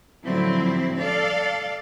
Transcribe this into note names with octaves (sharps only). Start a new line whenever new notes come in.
A2 D3 F3 F#3 C4 E4
A4 D5 F5